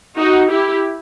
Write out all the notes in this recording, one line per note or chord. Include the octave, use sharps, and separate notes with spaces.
D#4 F#4
E4 G4